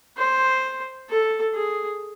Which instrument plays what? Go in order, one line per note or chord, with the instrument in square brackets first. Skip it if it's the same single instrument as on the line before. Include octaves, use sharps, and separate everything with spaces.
[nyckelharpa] C5
A4
G#4